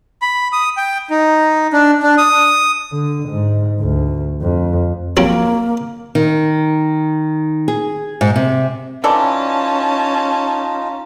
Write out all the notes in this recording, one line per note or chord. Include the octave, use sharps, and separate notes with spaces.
B5
D#6
G5
D#4
D4
D4
D#6
D3
G#2
D2
F2
F3 F#3 A#3 C4
D#3
G#4
G#2
C3
E3 C#4 D#4 F4 A4 D5 A5